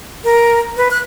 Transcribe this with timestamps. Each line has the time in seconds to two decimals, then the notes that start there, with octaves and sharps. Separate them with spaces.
0.24 A#4
0.77 B4
0.91 F#6